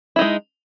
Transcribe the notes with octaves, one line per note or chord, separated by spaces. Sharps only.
G#3 D#4 E4